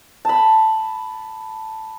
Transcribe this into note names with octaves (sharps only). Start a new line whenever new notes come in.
A5 B5